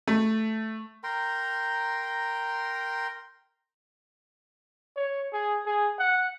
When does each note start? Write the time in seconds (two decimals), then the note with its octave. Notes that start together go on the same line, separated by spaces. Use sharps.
0.07 A3
1.04 A#4 G5 A#5 C6
4.96 C#5
5.33 G#4
5.66 G#4
5.99 F#5